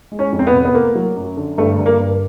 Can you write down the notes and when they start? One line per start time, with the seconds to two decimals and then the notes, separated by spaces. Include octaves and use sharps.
0.12 G#3
0.19 C#4
0.32 F2
0.39 C4
0.47 B3
0.54 C3
0.65 B3
0.74 A3 A#3
0.95 F#3
1.16 F#2
1.37 D3
1.58 G2 A3
1.79 G2
1.86 A#3
2.00 G2